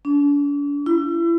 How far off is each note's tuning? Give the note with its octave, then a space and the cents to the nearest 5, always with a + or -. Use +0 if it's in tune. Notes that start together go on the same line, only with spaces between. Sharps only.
D4 -40
E4 +35